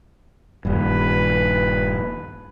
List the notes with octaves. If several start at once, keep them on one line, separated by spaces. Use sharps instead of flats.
D#1 G2 B4